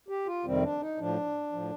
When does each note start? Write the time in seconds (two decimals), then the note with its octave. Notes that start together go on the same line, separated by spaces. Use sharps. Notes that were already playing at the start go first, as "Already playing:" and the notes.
0.08 G4
0.27 F4
0.45 F2 C3 D#3 G3 C4
0.62 D4
0.81 D#4
0.99 A2 F3 D4
1.52 A2 F3